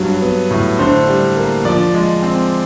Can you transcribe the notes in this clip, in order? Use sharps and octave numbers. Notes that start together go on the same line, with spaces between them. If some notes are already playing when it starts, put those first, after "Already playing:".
Already playing: G2 F#3
B3
A2
D3 C5
G3
A#3
F3 D5
G#3
C4